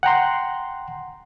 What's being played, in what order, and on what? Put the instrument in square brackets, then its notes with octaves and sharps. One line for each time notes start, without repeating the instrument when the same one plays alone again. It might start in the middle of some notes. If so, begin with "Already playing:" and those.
[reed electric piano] F#5 G5 A#5 C6